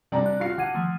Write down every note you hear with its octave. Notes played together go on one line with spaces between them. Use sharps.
C3 G3 D4 D5 A#5
F#6
F4 F#4 F5 C7
D3 F#5 G#6 D#7
D#3 F3 A3